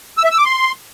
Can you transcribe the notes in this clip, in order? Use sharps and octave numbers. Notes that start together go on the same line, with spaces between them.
E6
E5
E6
D6
C6